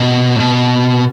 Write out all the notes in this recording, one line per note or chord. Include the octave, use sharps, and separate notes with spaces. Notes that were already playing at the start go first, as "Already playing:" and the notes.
Already playing: B2
A2
B2